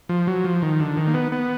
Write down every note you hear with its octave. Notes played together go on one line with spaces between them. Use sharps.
F3
F#3
F3
D#3
D3
D#3
A#3
B3
B3